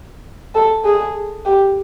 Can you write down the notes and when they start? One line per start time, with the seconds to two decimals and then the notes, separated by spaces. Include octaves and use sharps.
0.55 A4
0.85 G#4
1.45 G4